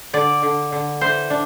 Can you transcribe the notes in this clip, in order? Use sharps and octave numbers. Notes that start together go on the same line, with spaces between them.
D3 D5
D3
D3
E3 C5
D4